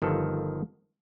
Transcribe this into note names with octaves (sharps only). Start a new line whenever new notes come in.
G1 D#3 F3 A4